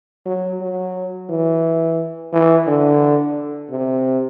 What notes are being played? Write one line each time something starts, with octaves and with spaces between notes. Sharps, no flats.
F#3
F#3
E3
E3
D3
C3